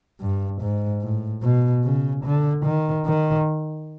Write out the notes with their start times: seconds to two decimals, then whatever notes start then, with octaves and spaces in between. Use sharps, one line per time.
0.21 G2
0.61 G#2
1.02 A2
1.43 B2
1.84 C#3
2.24 D3
2.65 D#3
3.06 D#3